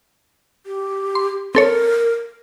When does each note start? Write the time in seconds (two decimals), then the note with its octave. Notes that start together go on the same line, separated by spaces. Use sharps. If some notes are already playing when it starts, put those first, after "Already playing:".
0.66 G4
1.15 C6
1.55 C4 A4 A#4 C#5